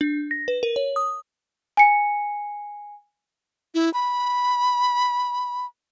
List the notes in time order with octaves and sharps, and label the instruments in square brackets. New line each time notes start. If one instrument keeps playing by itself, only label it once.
[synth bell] D4
A#6
B4
A#4
C#5
D#6
[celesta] G#5 C#7
[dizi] E4
B5